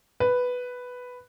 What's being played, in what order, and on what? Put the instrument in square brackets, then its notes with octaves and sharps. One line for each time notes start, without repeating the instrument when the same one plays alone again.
[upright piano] B4